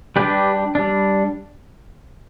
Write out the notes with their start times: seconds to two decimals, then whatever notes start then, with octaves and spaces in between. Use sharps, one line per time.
0.16 G3 D4 G4 B4
0.75 G3 D4